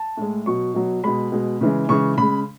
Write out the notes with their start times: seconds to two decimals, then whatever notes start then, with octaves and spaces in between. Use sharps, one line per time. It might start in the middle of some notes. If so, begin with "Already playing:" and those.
Already playing: A5
0.17 A2 G#3
0.46 B2 F#3 C#6
0.74 B2 F#3
1.04 B2 G#3 B5
1.32 B2 G#3
1.61 C#3 E3 G#3
1.89 C#3 E3 G#3 C#6
2.18 C#3 G#3 B5